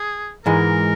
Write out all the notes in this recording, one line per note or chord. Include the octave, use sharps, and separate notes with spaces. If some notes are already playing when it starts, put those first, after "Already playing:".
Already playing: G#4
G#2 E3 G#3 A#4